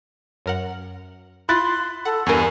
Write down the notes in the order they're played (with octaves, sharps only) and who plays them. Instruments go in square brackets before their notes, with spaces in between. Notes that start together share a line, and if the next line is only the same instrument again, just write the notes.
[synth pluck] F#2 A#4 F#5
[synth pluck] E4 F4 [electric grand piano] B5 F#6 A6 [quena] C6
[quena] A4 [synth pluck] F#5
[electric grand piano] E2 G2 [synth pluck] A#4 C#6 [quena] G#5